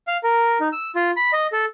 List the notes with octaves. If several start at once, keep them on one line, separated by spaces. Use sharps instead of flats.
F5
A#4
D#4
E6
F4
B5
D#5
A4